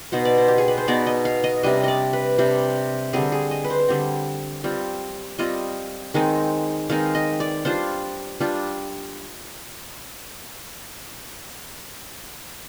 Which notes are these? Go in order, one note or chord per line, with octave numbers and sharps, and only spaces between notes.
B2 B3 D#4 C5
D5
C5
G4
G#4
B4
C5
B2 B3 D#4 D5
D#5
F5
D#5
C3 G3 D4 D#5
D5 D#5
B4
C3 G3 D4
D3 G3 C4 G#4
G#4
D#5
B4
C5
D3 G3 C4
G3 C4 F4
G3 C4 F4 D#5
D#3 G#3 C4 D#4
D#3 G#3 C4 D#4 F5
D#5
D5
G3 D4 F4 C5
G3 D4 F4